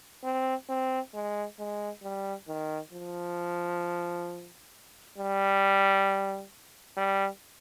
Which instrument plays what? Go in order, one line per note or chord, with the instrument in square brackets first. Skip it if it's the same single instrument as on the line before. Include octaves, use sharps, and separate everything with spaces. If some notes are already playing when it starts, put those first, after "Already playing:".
[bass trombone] C4
C4
G#3
G#3
G3
D#3
F3
G3
G3